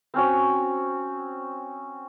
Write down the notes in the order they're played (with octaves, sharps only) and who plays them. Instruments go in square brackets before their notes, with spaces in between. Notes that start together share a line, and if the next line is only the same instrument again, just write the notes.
[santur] C4 C#4 F#4